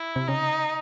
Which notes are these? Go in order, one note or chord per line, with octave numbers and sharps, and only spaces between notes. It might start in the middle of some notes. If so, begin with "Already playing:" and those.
Already playing: E4
C3
C#3 D#4